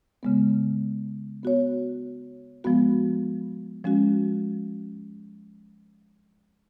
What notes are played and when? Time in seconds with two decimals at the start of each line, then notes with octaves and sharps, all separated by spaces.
0.23 C#3 G#3 B3
1.43 B3 F#4 C#5
2.64 F3 G#3 B3 F#4
3.84 F3 G#3 C#4 F#4